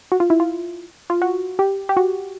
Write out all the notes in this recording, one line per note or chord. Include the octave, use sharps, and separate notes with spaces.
F#4
F4
E4
F4
F4
F#4
G4
G4
F#4